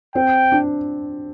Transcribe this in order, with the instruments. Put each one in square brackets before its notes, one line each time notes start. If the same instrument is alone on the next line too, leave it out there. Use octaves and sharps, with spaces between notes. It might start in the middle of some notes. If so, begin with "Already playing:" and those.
[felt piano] C4 [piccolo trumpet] G5
[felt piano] D4